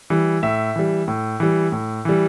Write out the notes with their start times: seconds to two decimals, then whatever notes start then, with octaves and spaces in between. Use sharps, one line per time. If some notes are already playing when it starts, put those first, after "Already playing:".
0.10 E3 G3
0.42 A2 E5
0.76 E3 G3
1.08 A2
1.40 E3 G3
1.72 A2
2.05 E3 G3